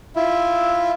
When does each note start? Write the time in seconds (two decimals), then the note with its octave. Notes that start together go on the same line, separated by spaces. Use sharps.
0.16 E4 F4 E5